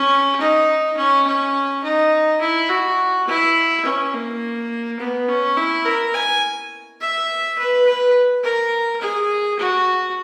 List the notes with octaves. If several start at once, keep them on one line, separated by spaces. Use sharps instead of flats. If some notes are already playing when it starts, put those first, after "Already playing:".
Already playing: C#4
D#4
C#4
C#4
D#4
E4
F#4
E4
C#4
A#3
B3
C#4
E4
A#4
G#5
E5
B4
B4
A#4
G#4
F#4